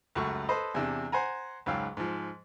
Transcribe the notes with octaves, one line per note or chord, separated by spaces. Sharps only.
C#2 F#2 A3 F#4 C#6
A4 B4 C5 D#5
E2 C3 D4
C5 F#5 G#5 A#5
C#2 G#2 F#3 F5 G5 E6
G#2 F3